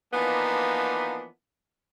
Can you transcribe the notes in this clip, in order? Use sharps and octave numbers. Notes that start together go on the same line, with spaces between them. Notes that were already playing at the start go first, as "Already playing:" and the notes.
E3 F3 A#3 B3 D4 D#4